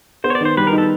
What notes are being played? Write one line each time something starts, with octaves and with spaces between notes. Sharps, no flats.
B3 C5
C#5
D5
D#3 C5
G3 B4
A#4
D#4
A4